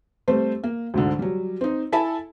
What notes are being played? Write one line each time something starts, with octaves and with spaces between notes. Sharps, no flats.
G3 A3 C4 C5
A#3
D2 G#2 D3
F#3 G3
C4 D#4
E4 A4 E5 G#5 A5 B5